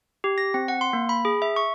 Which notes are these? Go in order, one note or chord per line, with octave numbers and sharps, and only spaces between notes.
G4
A#6
C4
F#5
C6
A#3
B5
G#4
E5
C#6